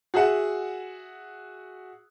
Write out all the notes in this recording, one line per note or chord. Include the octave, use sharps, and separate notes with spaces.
F#4 G#4 E5 F#5